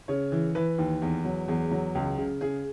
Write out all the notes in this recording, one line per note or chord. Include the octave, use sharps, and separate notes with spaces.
C#3 C#5
E3
E3 B4
D#2
E2
F#3
E2 G#4
F#3
C#2
C#3
C#3 G#4